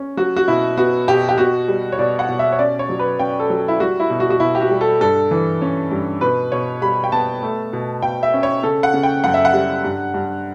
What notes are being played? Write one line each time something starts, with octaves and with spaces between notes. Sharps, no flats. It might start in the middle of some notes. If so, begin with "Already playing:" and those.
Already playing: C#4
F#3 F#4
F#4
B2 E4
B3 F#4
B2 G4
G4
B2 F#4
G3
C#5
B2 D5
F#5
B2
E5
C#5
C#4 D5
C#5
F#3
B4
C#4 G5
A4
F#3
E4
G3 F#4
E4
B2
F#4
F#4
B2 E4
G4
F#4
G3
A4
G2 A4
E3
C#4
G2
B2 B4
B2 C#5
G3 B5
G5
B3 A5
A3
B2
B2 G5
E5
C#4
C#5
C#3 A4
F#5
C#3
G5
F#2 F#5
E5
F#5
G3
G2
G2